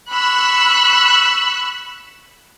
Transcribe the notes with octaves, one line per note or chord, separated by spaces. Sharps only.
B5 C#6 E6 F#6